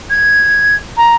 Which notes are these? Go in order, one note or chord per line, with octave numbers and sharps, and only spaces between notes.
G#6
A#5